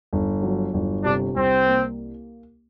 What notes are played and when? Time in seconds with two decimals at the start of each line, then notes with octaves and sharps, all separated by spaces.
0.13 G1
0.42 F#3
0.74 G1
1.04 C3 D4
1.35 C2 C4
1.66 A#3